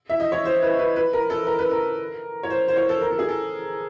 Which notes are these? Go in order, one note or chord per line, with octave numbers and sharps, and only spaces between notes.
E5
D#5
C#5
C5
B4
B4
B4
A#4
A4
A#4
B4
A#4
C#5
C5
C5
C#5
A4
A#4
A4
G#4
A4